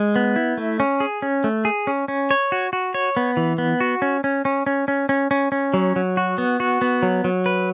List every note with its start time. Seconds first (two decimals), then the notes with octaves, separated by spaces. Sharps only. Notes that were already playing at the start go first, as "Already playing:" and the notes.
Already playing: G#3
0.16 B3
0.36 E4
0.57 A3
0.80 C#4
1.00 G#4
1.22 C#4
1.44 A3
1.65 G#4
1.87 C#4
2.08 C#4
2.31 C#5
2.52 F#4
2.73 F#4
2.94 C#5
3.17 B3
3.37 E3
3.58 B3
3.80 F#4
4.02 C#4
4.24 C#4
4.45 C#4
4.66 C#4
4.88 C#4
5.09 C#4
5.31 C#4
5.52 C#4
5.74 F#3
5.96 F#3
6.17 F#4
6.38 B3
6.60 F#4
6.82 B3
7.03 F#3
7.24 F#3
7.46 B4